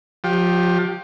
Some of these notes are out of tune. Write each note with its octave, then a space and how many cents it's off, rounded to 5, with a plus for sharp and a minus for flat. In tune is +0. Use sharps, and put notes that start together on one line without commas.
F3 +30 G4 +0